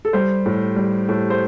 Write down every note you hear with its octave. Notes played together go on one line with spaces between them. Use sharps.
A4
G3 C5
A2
G3
A2
C5